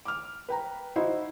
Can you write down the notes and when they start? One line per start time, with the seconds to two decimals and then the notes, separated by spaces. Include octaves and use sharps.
0.05 D6 F6
0.49 B4 G5 A#5
0.96 D#4 E4 F#4 C5 D#5